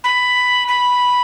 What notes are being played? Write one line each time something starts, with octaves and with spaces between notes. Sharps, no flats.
B5
B5